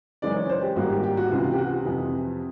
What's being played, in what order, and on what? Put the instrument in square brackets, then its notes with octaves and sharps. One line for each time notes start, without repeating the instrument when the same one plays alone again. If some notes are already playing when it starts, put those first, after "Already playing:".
[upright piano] F#2 C#3 E3 G#3 C#4 D5
C#5
C5
G4
G#1 G#2 D#3 G3 A#3 F#4
G4
G4
F#4
C#2 C3 E3 F4
F4
G4
F#4
F2 C3 E3